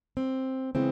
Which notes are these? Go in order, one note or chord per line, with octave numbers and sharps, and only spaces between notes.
C4
C#3 E3 G#3 B3 C4